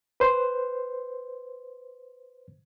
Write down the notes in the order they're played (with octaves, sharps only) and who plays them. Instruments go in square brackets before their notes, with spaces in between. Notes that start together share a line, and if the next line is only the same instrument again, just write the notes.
[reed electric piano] B4 C5